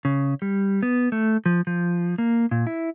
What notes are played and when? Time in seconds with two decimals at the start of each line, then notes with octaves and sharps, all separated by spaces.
0.05 C#3
0.42 G3
0.83 B3
1.12 A3
1.46 F3
1.67 F3
2.18 A#3
2.51 A#2
2.67 E4